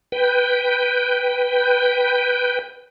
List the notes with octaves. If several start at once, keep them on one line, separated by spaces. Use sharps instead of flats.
B4 G5